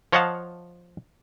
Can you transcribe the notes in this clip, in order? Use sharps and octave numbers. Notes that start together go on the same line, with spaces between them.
F3 C#5 D#5 F5 F#5 A5